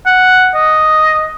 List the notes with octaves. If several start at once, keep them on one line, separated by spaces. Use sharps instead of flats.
F#5
D#5